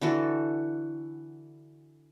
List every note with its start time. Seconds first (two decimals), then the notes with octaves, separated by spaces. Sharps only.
0.01 D3 E3 F#4 A4